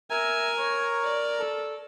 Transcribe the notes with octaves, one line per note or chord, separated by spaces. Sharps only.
A#4 E5 G#5 A#5
C#5
D5
A4